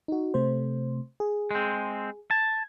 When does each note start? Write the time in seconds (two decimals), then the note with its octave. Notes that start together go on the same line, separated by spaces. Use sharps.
0.08 D#4 F#4
0.34 C3 A3 C5
1.20 G#4
1.51 G#3 C4
2.31 A5 G#6